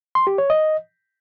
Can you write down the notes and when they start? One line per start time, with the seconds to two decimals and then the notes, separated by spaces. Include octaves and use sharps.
0.15 C6
0.27 G4
0.38 C#5
0.50 D#5